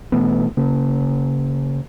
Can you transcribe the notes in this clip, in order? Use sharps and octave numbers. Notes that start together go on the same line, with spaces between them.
B2 E3 A3 B3
C#3 A#3